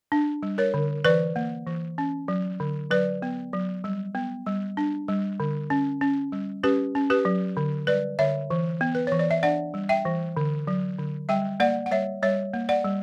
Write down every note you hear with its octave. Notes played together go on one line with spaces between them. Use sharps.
D4
G3
A#4 C#5
D3
E3 B4 D5
A#3
E3
C#4
F#3
D3
F#3 B4 D5
B3
F#3
G3
B3
G3
D4
G3
D3
C#4
C#4
G3
C#4 G4 B4
C#4
G4 B4
F#3
D3
G3 B4 D5
D3 C#5 E5
E3
B3
B4
E3 C#5
D5
E5
D4 D5 F#5
G3
E5 G5
E3
D3
F#3
D3
G3 E5 G5
A#3 D5 F#5
F#5
G3 C#5 E5
G3 C#5 E5
A#3
D5 F#5
G3